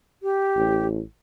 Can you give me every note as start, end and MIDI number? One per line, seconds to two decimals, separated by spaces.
0.23 0.87 67
0.56 1.00 33